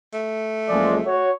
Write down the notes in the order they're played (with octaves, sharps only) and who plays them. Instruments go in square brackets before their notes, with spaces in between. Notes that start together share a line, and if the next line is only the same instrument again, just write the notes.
[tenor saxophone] A3
[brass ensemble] F#1 F3 G#3 [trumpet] D5
[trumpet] F#4 [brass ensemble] C#5